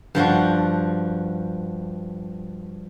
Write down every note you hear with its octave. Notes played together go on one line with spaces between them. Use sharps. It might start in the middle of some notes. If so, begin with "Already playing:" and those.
G2 F3 G3 F#4